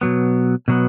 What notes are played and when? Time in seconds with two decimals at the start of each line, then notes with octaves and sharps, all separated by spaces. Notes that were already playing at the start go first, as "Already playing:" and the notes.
0.01 B2 F#3 B3
0.68 B2 F#3 B3